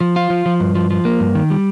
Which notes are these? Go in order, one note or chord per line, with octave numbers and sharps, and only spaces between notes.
F3
F4
F3
F3
G2
F3
F3
A#3
G2
D#3
G3